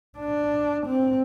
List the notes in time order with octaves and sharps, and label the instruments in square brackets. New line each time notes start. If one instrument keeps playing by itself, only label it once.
[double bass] D4
C4